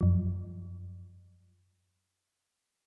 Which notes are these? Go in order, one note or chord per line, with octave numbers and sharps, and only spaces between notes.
F#2 F3